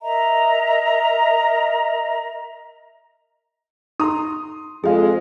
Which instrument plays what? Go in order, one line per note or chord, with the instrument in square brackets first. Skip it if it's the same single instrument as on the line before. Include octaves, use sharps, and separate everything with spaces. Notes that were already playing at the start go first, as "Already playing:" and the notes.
[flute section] A#4 D#5 E5 A#5
[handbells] D#4 A#5 [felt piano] C6 D#6
[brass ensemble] F2 G#3 [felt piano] F3 F5 [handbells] G#4